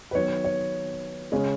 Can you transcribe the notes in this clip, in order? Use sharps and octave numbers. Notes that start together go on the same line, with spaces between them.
B4
D#3 F#3 B3 C#5
C#5
C#3 G#3 C#4